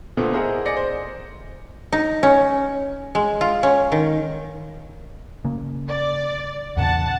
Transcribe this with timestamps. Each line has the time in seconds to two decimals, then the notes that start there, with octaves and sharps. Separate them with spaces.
0.17 A#2 D3 A3 B3 C4
0.33 E4 G#4 A#4 C5 D#5 F#5
0.65 D5 D#5 G#5 A#6 C#7
0.77 C5
1.92 D#4
2.23 C#4
3.15 G#3
3.41 F4
3.63 C#4
3.92 D#3
5.45 C#3 A#3
5.88 D5
6.77 E2 A#2 C#3 F#5 A5